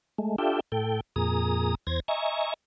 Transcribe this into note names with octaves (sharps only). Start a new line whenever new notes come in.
G#3 A3
D4 F4 G4 A4 E5 G5
A2 A4 G5
F2 A#2 G#4 A#5 D#6
E2 C5 G#6 A#6
D#5 E5 G#5 A#5 C#6